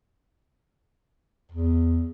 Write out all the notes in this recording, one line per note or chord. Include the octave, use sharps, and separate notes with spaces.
E2